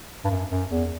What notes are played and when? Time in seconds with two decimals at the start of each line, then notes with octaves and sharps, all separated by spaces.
0.24 G2
0.30 F#2
0.49 F#2
0.70 E2